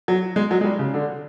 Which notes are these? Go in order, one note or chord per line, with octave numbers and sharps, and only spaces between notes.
F#3
G#3
F#3
G#3
G3
C#3
D3